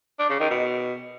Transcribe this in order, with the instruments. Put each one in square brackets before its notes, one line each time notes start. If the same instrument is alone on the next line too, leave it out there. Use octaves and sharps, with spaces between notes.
[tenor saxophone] D4
C#3
D#3
B2